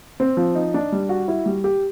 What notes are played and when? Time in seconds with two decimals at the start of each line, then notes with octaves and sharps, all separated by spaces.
0.20 C4
0.37 F3
0.55 D#4
0.74 D4
0.92 G3
1.09 F#4
1.28 E4
1.46 G3
1.64 G4